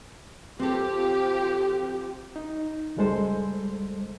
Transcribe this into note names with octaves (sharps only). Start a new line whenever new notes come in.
F3 C4 G4 A4
D#4
C#2 F#2 G3 G#3 A4 C5